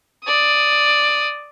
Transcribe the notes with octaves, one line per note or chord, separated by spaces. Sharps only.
D5 D#6